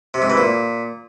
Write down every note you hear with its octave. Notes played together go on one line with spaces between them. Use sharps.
C3
G#2
E3
A#2